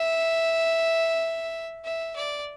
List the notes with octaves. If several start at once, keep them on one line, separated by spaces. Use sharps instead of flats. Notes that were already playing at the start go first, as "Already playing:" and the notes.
Already playing: E5
E5
D5